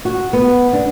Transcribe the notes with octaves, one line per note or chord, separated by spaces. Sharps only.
F#4
B3
D4